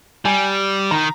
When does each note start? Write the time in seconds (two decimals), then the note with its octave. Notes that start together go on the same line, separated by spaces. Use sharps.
0.25 G3 G#5
0.91 D#3 A#5